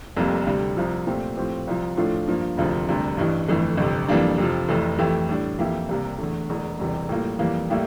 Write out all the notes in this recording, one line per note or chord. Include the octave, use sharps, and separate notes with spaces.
F1 F2 C3 G3 A#3
D2 C3 G3
C2 C3 F3
A#2 A3 C4 G4
A2 F3 C4 G4
C2 C3 F3
A2 F3 A3 D4 F4
G2 F3 A#3
E1 D2 C3 F3
E1 D2 C3 G3
A1 G2 E3 G3
G1 F2 E3 A3
G1 F2 C3
F2 E3 G3 A#3 D4
F2 C3 F3
F1 F2 C3 E3 A3
F2 E3 A3 E4 G4
A2 G3 D4
F2 E3 A#3 E4 G4
C2 C3 G3 A#3
E2 D3 A3
E1 E2 E3 A3
E1 E2 C3 E3 G3
A2 G3 A#3 F4
F2 E3 G3 A#3
A2 G3 A#3 E4 G4